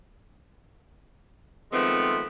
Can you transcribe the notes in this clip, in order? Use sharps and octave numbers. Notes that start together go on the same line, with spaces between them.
D#3 F3 G#3 A3 B3 C4